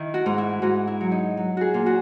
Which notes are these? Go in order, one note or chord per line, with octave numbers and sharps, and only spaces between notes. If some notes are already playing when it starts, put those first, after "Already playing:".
Already playing: D#3 E4
F#4
G#2
E4
G#2 F#4
E4
F#3
D#4
F#3
F#4 G#4
A#2
F#4